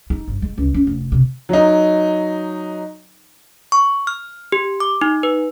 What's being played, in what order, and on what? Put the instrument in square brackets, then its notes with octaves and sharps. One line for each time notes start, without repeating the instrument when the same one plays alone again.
[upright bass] D#4
G1
G#3
C#2
C#4
F1
C3
[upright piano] F#3 D#4
[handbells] C#6
F6
G4
D6
D#4
B4